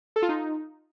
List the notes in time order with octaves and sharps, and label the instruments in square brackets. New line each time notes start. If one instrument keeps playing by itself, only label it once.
[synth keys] A4
F4
D#4